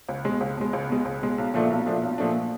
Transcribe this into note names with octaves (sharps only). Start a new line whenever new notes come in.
C#2
B2 G#3
C#2
B2 G#3
C#2
B2 G#3
C#2
B2 G#3
B1
A#2 F3 A3 D4
B1
A#2 F3 A3 D4
B1
A#2 F3 A3 D4